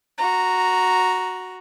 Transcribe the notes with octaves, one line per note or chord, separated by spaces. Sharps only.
F#4 A#5